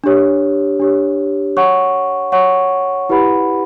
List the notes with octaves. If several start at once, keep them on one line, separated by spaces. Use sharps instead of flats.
D4 G4 C#5
D4 G4 C#5
C#5 F#5 C#6
C#5 F#5 C#6
E4 G4 B4 F#5 B5